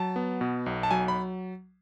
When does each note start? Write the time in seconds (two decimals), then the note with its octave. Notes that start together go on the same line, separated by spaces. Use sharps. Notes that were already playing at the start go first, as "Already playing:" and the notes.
Already playing: F#3 A5
0.16 B3
0.41 B2
0.66 B1
0.83 A5
0.91 F#3 G#5
1.08 B5